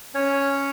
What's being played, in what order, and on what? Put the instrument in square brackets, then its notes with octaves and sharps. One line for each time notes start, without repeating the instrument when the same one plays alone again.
[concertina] C#4 C#5